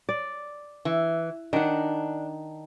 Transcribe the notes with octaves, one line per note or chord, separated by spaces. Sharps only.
D5
E3
D#3 D4 F#5